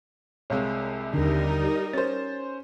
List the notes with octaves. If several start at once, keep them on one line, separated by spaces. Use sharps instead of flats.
C2 C3 G#3 C#5 F5
D#2 D3 G3 D#4 A#4
C#4 C5 A6